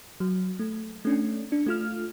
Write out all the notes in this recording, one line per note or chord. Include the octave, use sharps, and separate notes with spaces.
F#3
A3
A3 C#4 D4
D4
A3 F4 F6